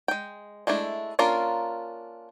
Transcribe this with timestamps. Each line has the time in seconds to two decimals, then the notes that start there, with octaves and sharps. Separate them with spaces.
0.08 G#3 G5
0.67 G#3 A3 D4 E4
1.19 A#3 C#4 D4 F4 A#4